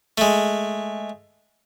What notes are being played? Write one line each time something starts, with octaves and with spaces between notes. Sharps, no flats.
G#3 A3